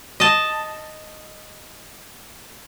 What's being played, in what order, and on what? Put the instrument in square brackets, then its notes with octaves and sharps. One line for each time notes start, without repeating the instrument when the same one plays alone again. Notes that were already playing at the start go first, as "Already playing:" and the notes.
[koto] D#5 A5